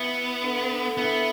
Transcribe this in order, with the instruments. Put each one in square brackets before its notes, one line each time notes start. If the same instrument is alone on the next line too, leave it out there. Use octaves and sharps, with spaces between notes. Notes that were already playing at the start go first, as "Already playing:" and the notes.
Already playing: [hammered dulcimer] E3 [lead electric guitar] B3
[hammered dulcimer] D3
D3
[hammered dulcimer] E3 [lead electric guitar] B3